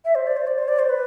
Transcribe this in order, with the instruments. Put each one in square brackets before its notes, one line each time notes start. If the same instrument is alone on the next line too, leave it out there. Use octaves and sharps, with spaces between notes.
[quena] E5
C5
D5
C5
D5
C5
D5
C5
B4